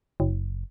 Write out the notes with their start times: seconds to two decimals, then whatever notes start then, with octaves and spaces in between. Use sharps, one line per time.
0.20 F#1